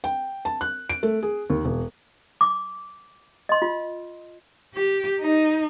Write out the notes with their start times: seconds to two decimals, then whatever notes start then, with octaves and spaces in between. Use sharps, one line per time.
0.04 G5
0.45 A5
0.61 F#6
0.90 D7
1.03 A3
1.23 G#4
1.50 D#2
1.65 E1
2.41 D6
3.49 D#5 C6
3.62 F4
4.75 G4
5.20 D#4